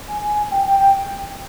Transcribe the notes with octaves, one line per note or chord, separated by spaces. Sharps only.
G#5
G#5
G5
G5
G5